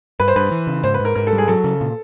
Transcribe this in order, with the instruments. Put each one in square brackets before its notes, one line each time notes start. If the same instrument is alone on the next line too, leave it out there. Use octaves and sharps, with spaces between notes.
[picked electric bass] G2 [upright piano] B4
[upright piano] C5
[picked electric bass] G2 [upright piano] B4
[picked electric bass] E3
C#3
[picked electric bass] G#2 [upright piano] C5
[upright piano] B4
[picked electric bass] G#2
[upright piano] A#4
[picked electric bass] G#2 [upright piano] A#4
[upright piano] A4
[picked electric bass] G3
[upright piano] G#4
[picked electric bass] F#3 [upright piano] A4
[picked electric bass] C#3
A#2